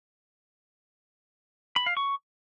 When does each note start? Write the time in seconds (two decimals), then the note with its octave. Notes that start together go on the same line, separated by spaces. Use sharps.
1.76 B5
1.86 F5
1.97 C#6